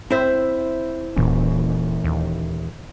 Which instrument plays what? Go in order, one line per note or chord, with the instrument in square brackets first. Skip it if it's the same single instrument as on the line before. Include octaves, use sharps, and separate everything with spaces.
[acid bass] C4 [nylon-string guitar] E4 C5 E5
[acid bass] D#1 [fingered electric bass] A#2 E3 C#4
[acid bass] D#2